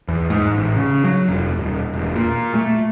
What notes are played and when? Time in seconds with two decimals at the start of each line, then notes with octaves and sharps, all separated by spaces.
0.08 E2
0.30 G#2
0.57 A1
0.76 C#3
1.04 F#3
1.29 F1
1.57 D#1
1.93 E1
2.15 A#2
2.55 A3